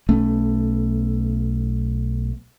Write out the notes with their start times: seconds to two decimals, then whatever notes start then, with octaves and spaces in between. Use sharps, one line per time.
0.09 B1 A3 B3 C#4